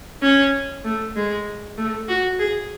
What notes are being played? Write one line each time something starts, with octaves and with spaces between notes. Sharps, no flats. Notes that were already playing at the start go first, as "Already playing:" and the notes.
C#4
A3
G#3
A3
F#4
G#4